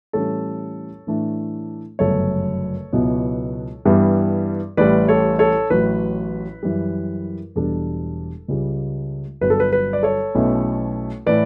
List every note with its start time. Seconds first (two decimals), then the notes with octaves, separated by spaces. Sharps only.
0.13 A2 E3 G3 C#4 A4 C#5
1.07 A2 E3 A3 D4
1.99 G1 F#2 C#3 F#3 A3 A4 C#5
2.93 C#2 B2 F#3 B3 E4
3.85 G2 E3 G3 B3 E4
4.77 A1 A2 G3 B4 D5
5.08 A4 C#5
5.39 A4 C#5
5.70 A1 A2 F#3 B4
6.63 F#2 E3 G3
7.56 E1 E2 B2 G3 D4 A4
8.48 C#2 C#3 G3
9.41 G1 G2 F#3 B4
9.50 A4
9.60 B4
9.73 B4
9.93 D5
10.03 A4 C#5
10.35 B1 B2 A3 C#4 E4
11.26 A2 E3 B4 D5